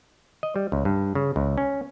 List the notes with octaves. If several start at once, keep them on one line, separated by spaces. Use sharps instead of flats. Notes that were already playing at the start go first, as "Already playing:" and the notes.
D#5
G3
C#2
G2
C#3
C#2
C#4